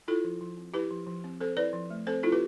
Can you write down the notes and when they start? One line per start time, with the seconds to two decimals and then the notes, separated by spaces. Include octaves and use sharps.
0.08 E4 F4 A4
0.24 F3
0.41 F3
0.57 C4
0.74 E4 G4 B4
0.91 F3
1.07 F3
1.24 C4
1.41 C4 A4 C5
1.57 E4 B4 D5
1.73 F3
1.90 A3
2.07 C4 A4 C5
2.23 E4 F4 A4
2.32 G4 B4